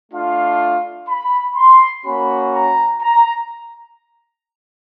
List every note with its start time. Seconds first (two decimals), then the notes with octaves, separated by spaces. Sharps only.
0.12 A3 D4 F4 F5
1.08 B5
1.56 C6
2.05 A#3 C#4 F#4 B5
2.53 A#5
3.01 A#5